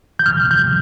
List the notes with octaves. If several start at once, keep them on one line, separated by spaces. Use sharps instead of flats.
G6
F6
G6